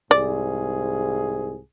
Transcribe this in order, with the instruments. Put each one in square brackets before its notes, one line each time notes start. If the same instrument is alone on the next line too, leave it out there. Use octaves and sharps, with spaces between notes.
[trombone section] C2 G#2 G#4 [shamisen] D5